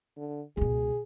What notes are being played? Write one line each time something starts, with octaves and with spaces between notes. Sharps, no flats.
D3
C#2 B2 G#4